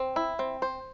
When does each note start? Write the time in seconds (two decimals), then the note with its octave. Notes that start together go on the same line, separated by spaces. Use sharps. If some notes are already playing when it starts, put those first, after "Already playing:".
Already playing: C4
0.16 E4
0.39 C4
0.62 C5